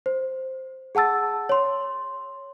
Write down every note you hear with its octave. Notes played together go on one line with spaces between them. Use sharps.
C5
G#4 F#5 A5 E6 A6
C#5 C6